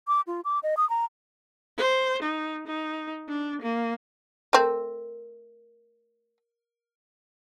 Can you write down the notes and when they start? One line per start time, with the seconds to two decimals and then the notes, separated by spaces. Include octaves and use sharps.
0.08 D6
0.27 F4
0.45 D6
0.63 D#5
0.77 D#6
0.90 A#5
1.78 C5
2.22 D#4
2.67 D#4
3.28 D4
3.62 A#3
4.53 A3 C4 A#4 E5